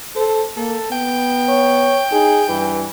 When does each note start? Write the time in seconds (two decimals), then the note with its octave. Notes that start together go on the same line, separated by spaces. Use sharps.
0.16 A4 C5
0.57 A#3 A4
0.91 B3 G5
1.49 C#5
2.12 D#4 G#4
2.49 G2 E3